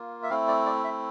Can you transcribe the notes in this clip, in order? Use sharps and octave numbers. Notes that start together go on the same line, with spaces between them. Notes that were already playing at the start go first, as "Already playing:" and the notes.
Already playing: A#3 F4
E5
A3 C4 E4 F5
D5
D5
E5